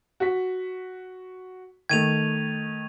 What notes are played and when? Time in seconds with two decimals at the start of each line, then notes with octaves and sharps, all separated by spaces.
0.20 F#4 B6
1.89 D#3 A3 G#6 D#7 F7